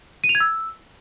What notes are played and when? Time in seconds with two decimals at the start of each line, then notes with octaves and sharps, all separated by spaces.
0.24 D#7
0.29 F7
0.35 G#6
0.40 E6